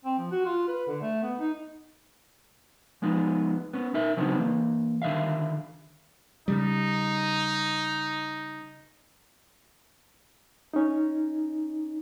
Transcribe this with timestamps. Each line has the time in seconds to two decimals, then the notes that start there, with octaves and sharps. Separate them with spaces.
0.05 C4
0.18 F3
0.31 F#4
0.45 F4
0.68 B4
0.87 D3
1.02 A3
1.23 B3
1.40 D#4
3.02 F3 G#3 B3 D#4
3.73 B3 C#4
3.94 D#4 A#4 E5
4.17 C#3 F#3 B3 C4 D4 D#4
4.37 E3 A#3
5.02 D3 D#3 E5 F5
6.48 C#3 G3 D#4
10.74 C#4 D#4